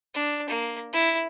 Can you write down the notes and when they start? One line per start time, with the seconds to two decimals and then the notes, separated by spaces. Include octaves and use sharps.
0.14 D4
0.50 A#3
0.93 E4